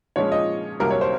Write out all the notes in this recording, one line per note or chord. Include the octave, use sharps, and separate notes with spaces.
A#2 F3 G#3 C#4 C#5
D#5
C2 C3 F#3 A#3 A#4
C#5
C5